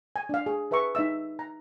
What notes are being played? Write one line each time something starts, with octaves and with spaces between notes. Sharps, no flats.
G#5
D4 F5
G#4
G#4 B4 E5 A#5 C#6
D#4 D#5 E5 E6
A#5